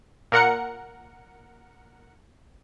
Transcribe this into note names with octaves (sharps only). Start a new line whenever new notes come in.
A#2 A#4 F#5 C#7